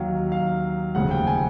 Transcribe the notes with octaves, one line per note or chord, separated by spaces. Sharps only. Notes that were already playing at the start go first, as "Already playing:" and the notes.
Already playing: D#2 D#3 F#3 F5
F5
F1 D#2 C#3 F#5
G5
G#5